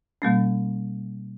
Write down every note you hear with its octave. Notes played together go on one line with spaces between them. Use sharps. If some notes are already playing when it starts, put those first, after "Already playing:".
B2 G3 A#3 C#4